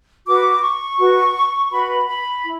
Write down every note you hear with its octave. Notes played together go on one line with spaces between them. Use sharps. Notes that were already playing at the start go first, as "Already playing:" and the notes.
F#4 B4 D6
C#6
F#4 B4
F#4 B4 B5
B5
E4